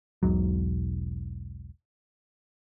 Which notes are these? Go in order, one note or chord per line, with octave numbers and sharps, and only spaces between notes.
E1 B1 G#2 F#3